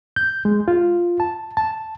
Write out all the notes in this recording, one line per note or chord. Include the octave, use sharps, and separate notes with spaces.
G6
G#3
F4
A5
A5